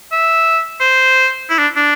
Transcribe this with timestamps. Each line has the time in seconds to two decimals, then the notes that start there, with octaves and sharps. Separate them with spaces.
0.12 E5
0.80 C5
1.49 E4
1.58 D4
1.76 D4